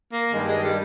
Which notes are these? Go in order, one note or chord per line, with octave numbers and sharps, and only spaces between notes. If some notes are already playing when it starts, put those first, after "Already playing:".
A#3
G2 D#3 G3 G#3
G#3
G3